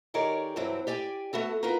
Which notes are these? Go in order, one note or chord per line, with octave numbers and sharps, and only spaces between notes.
D#3 G4 G#4 A#4 C#5 D5
G2 C3 E3 F#3 C4
G4 D5 G5 G#5
A3 B3 F#4 A4
D#4 F4 F#4 A#4 B4